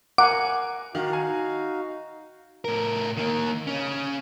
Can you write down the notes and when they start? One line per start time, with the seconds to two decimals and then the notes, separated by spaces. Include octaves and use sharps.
0.18 A#4 F5 F#5 G#5 D6
0.95 D#3 D#4 F#4 F5
1.13 G#5
2.65 A2 A#4
3.17 D#3 A#3
3.67 C#3 C#4